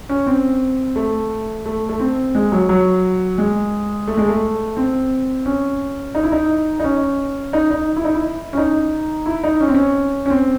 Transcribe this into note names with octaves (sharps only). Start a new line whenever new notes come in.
C#4
C4
A3
A3
A3
C4
G#3
F#3
F#3
G#3
A3
G#3
A3
C4
C#4
D#4
E4
D#4
D#4
C#4
D#4
D#4
E4
D#4
E4
C#4
D#4
E4
D#4
C#4
C4
C#4
C#4
C4